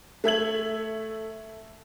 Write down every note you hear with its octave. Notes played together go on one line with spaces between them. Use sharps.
A3 E5 G#6 F#7